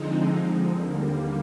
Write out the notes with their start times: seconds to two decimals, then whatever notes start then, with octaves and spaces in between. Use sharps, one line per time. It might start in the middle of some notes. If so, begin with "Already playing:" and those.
Already playing: D3 F3 G#3 C4 D#4
0.71 D#2 D3 G3 A#3